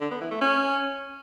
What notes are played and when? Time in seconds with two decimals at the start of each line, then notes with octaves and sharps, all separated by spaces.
0.01 D3
0.11 B3
0.21 E3
0.31 A3
0.41 C#4